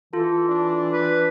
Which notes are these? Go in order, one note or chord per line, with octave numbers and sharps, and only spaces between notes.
E3 F4 A4
D4
B4